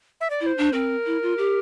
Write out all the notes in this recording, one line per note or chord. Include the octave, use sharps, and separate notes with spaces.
E5
D5
E4 D5
C5
D4
C4 A#4
E4
F4
G4